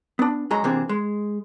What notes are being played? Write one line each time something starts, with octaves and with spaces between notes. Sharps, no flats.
B3 D4
F#2 F#3 G#3 A#5
C3 E3 A#3 C4 D4 G#4
G#3